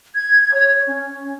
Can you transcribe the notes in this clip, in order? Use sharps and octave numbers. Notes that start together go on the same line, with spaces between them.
G#6
C#5
C#4